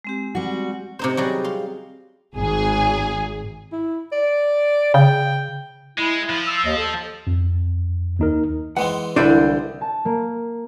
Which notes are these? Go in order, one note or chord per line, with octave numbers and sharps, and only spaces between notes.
G#3 C4 G4
G3 F#4
C3 D#4 C5
F#3 G3 G#4
F5 C6
G#1 G#4
E4
D5
C#3 G5
G#3 E4
F3
E6
D#2 D#5
A4
F2
D#2 D#4 A#4
E3 G#3 C4 F#5
C2 D3 D4 E4 C5 B5
A5
A#3